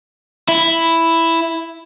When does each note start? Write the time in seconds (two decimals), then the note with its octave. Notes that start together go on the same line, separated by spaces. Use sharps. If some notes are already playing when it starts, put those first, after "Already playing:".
0.49 E4